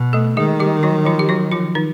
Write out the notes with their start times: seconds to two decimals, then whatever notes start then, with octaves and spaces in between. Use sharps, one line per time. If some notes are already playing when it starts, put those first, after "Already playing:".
Already playing: B2
0.13 A3 A4
0.37 D#3 G#3 G#4
0.60 G3 G4
0.83 F#3 F#4
1.05 F3 F4
1.19 G4
1.29 F#3 F#4
1.51 F3 F4
1.75 D#3 D#4